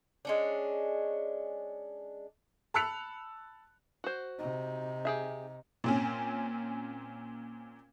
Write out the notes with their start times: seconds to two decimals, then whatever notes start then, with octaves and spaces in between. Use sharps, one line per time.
0.25 G#3 C#4 D4
2.74 A5 B5 E6 F#6 C#7 F7
4.04 F#4 C5
4.39 C3 D#4
5.05 G4 G#4 E5
5.84 A#2 C4 C#4